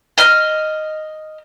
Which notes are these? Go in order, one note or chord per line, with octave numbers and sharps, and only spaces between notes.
D#5 F6